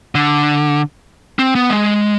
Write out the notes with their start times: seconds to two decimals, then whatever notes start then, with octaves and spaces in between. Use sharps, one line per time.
0.15 D3
1.39 C4
1.55 B3
1.70 G#3